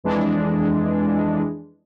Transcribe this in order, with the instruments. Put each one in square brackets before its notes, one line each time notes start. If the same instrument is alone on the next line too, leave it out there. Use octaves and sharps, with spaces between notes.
[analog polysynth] F2 E3 G#3 D4